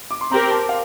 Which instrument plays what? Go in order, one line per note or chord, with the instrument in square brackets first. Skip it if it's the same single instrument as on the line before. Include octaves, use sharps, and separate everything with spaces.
[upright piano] D6
C6
[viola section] C4 G4 A#4 [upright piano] A#5
[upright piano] A5
F5